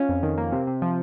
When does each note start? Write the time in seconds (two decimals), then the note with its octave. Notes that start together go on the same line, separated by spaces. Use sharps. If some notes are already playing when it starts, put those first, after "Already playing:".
Already playing: C#4 F4
0.09 F2
0.23 D#3
0.38 A#3
0.52 C3
0.67 C3
0.82 F3